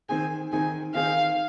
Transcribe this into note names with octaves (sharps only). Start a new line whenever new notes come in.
D#3 C4 D#4 G#4 G#5
D#3 C4 D#4 G#4 G#5
D#3 C4 D#4 G#4 F5